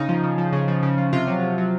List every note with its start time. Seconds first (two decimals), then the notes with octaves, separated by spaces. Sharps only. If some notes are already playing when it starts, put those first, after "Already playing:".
Already playing: C#3 D#4
0.09 F3
0.23 C#3
0.38 F3
0.52 C#3
0.68 F3
0.83 C#3
0.98 F3
1.13 C3 F4
1.28 F#3
1.42 C3
1.58 F#3